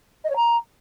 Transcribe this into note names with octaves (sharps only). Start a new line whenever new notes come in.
D#5
C#5
A#5